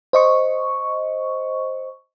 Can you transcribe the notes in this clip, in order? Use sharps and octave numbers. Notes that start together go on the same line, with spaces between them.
C5 D#5 C#6